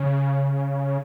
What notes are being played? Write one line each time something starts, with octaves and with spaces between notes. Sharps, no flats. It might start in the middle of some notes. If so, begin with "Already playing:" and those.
Already playing: C#3